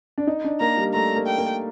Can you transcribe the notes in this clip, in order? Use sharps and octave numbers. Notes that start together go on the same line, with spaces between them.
D4
D#4
D4
A#3 A#5
G3
A3 A#5
A#3
G5
A#3